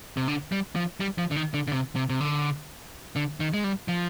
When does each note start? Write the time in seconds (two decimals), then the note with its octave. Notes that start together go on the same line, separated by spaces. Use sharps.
0.17 C3
0.28 D3
0.52 G3
0.76 F3
1.00 G3
1.18 F3
1.31 D3
1.36 D#3
1.54 D3
1.68 D3
1.72 C3
1.96 C3
2.09 C3
2.20 D3
3.16 D3
3.40 D#3
3.54 G#3
3.64 G3
3.88 F3